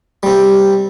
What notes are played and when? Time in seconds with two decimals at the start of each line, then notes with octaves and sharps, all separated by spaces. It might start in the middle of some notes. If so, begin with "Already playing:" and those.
0.23 C3 G3